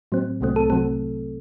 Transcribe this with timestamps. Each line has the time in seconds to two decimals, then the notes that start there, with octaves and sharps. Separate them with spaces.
0.12 A2 F#3 C4
0.41 C2 C3 F#3 A3 C4
0.56 A4
0.70 C3 F#3 C4 A4